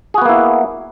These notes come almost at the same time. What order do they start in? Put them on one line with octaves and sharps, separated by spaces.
G#4 F#4 B3 A#3 E4